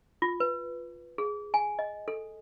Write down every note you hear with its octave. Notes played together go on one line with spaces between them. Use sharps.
F4
B4
G#4
G#5
D#5
A4